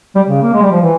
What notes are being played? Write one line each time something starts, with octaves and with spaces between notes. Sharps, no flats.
G3
C#3
A#3
G#3
G3
F3
E3